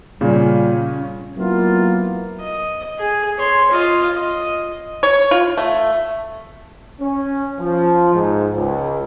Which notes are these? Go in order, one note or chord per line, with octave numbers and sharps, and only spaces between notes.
A#2 C#3 G3 C#4
F#3 A#3 B3 E4 F4
D#5
G#4
C#5 C6
F4 D#5
D#5
C#5
F4
A3
C#4
F3
G#2
C#2